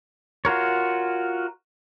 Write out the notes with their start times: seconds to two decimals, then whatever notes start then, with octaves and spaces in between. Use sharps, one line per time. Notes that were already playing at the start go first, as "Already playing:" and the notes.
0.45 F4 F#4 A#4 C#5